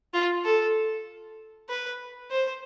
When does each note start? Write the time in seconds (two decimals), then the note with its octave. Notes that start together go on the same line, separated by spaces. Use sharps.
0.14 F4
0.45 A4
1.69 B4
2.31 C5